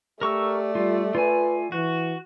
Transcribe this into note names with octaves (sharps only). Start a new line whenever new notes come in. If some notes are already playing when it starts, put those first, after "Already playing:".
A3 G4 A#4 D5 C#6 E6
G3 F4
F4 B4 G#5
E3 F#4